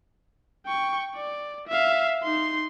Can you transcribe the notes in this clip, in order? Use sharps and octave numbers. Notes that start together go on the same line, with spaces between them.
G5 C#6
D5
E5 F5
D#4 C6